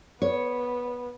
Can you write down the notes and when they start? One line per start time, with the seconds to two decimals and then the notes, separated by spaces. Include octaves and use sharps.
0.22 B3 C#5